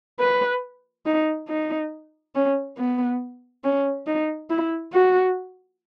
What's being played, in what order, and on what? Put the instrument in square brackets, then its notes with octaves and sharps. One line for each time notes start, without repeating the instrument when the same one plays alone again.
[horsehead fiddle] B4
D#4
D#4
C#4
B3
C#4
D#4
E4
F#4